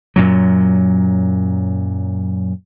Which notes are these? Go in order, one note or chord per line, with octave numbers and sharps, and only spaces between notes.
F#2 A#2 F#3